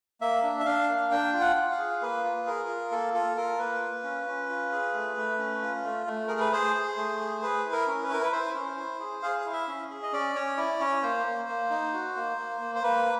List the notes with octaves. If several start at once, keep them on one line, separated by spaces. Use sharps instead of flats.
A#3 E5
D4
E5
D4 F5
A#3
D4 G5
F4
F#5
F4
F5
G#4
A#3 B4
F4
G#4 A#4
F4
A#3 A4
F4 A4
F4 A#4
A#3 B4
F4
C#4
C#4
F4
G#4
A3
A3
C#4
F4
A3
A3
G#4 A#4
B4
G#4 C5
G#4
A3
G#4
G#4 B4
E4
A#4
C#4
B4
E4 A#4
B4
E4 C5
C#4
E4
G#4
G#4 F5
E4 F5
E5
C#4
G#4
D#5
C#4 D5
C#4 C#5
E4 D5
C#4 C#5
A#3 C5
A#3
A#3
D#4
F#4
A#3
A#3
A#3
C5
A#3 B4